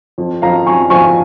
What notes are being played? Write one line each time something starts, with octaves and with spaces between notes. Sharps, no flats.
F2
F2 F5 A#5
F2 G#5 C#6
F3 G#5 C#6